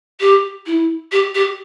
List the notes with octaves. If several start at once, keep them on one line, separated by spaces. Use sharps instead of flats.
G4
E4
G4
G4